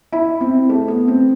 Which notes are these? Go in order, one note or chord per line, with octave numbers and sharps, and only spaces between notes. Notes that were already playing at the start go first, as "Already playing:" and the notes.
E4
C4
A3
B3
C4